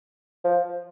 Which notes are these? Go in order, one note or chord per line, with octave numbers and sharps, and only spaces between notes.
F3